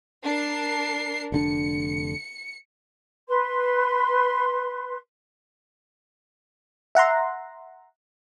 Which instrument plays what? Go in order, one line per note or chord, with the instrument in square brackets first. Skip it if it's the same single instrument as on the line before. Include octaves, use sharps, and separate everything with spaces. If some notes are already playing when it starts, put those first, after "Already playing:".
[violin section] D4 A#4 C7
[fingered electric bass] F1 D3 D4 [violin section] C#7
[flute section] B4 C6
[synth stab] E5 F#5 A#5 C6